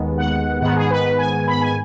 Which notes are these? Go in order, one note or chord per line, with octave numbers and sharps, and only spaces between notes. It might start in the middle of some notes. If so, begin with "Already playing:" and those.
Already playing: D#2 D#3 G#3 B3
F#5
G#2 D#3 B3 F#5
G#4
B4
G#5
B5
G#5